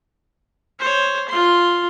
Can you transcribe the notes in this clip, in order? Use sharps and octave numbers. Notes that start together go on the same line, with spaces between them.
C5 C#5
F4 C6